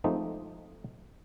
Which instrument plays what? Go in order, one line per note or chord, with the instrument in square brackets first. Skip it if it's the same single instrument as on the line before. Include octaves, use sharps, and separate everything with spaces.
[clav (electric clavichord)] F3 G#3 A3 C4 D#4 G4